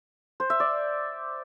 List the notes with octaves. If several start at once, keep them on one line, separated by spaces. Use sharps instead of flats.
C5
E5
D5